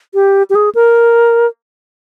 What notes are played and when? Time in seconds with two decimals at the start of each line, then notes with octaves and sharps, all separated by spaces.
0.14 G4
0.50 G4
0.55 G#4
0.75 A#4